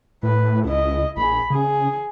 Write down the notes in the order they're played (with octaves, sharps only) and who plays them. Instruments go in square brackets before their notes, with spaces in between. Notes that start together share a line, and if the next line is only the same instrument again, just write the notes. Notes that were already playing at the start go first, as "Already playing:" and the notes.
[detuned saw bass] A2 [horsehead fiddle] B4
[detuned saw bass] C#2 [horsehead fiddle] E4 D#5
[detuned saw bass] A#1 [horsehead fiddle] G#4 B5
[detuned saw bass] C#3 [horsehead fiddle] G#4